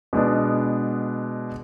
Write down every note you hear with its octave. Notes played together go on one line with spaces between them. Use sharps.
B2 G#3 B3 D4